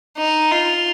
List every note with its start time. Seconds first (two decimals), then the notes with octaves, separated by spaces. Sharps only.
0.17 D#4
0.51 F4